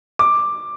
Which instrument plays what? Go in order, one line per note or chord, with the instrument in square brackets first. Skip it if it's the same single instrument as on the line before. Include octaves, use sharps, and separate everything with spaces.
[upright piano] D6